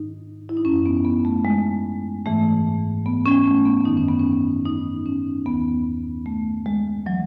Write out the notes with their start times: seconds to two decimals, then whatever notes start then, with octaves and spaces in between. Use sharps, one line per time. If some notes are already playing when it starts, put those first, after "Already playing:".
Already playing: G#2 D#3 D#4
0.49 E4
0.57 D#4
0.65 F#2 E3 C#4
0.86 B3
1.05 B3
1.25 A3
1.45 G#3
2.25 G#2 E3 A3
3.06 B3
3.26 C#4
3.46 A3
3.66 B3
3.85 F#2 D#3 D#4
3.97 C#4
4.09 B3
4.20 C#4
4.66 D#4
5.06 C#4
5.45 D#2 D#3 B3
6.26 A3
6.66 G#3
7.06 E3 F#3